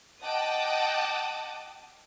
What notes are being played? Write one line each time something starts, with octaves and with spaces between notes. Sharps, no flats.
D#5 F#5 G5 A5 D6 D#6